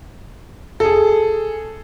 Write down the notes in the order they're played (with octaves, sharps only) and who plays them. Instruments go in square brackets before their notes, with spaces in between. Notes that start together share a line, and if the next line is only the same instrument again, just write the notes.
[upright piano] G#4 A4